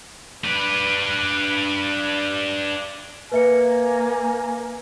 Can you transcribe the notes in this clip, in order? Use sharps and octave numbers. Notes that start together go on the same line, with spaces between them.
D4 B4
A#3 B4 E5 G#5 C#7